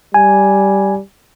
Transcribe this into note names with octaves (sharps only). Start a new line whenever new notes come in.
G3 G#5